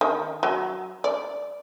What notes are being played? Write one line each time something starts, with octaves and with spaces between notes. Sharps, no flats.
D#3
F#3
D5